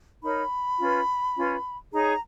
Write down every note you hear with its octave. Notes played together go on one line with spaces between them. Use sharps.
D#4 A#4 C#5 B5
C#4 F4 B4
C#4 F4 B4
D#4 G#4 C#5 A#5